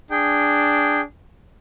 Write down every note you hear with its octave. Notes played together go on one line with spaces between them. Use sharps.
D4 G#4 G5